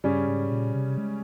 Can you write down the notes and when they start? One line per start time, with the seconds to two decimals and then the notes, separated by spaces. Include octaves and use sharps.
0.04 G2 C#3 G3 C#4
0.27 G#2
0.50 A#2
0.74 C3
0.98 G#3